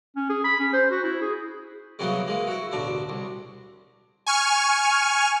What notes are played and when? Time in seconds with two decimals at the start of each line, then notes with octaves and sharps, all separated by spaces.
0.16 C#4
0.30 G#4
0.44 B5
0.60 C#4
0.73 C5
0.91 F#4
1.04 E4
1.21 G#4
1.99 C2 C#3 E3 F#3 A#3 B3
2.27 E3 G#3 A#3
2.47 E4 F#4
2.72 A1 D2 B2 D4
3.09 C2
4.27 G#5 C#6 F6